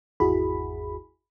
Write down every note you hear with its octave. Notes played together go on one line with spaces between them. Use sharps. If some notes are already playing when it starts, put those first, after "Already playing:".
G#1 E2 E4 F#4 G#4 B5